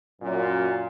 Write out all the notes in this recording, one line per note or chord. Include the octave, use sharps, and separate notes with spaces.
F#2 A#2